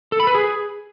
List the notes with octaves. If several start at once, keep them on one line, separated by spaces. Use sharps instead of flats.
A4
B5
B4
G#4